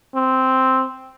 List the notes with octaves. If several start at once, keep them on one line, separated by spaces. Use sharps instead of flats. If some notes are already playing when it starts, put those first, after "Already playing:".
C4